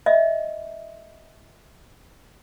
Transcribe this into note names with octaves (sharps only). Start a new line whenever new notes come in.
D#5 E5